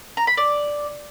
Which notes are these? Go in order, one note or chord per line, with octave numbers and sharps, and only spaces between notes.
A#5
B5
D5